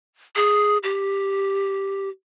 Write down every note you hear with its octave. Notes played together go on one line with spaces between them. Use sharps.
G#4
G4